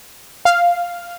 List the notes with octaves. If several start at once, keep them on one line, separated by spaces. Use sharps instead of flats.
F5